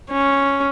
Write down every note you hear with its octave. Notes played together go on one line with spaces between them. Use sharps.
C#4